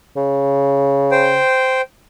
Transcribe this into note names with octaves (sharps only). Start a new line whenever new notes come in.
C#3
C5 G5